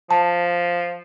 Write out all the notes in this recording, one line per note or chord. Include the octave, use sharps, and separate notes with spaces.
F3 A5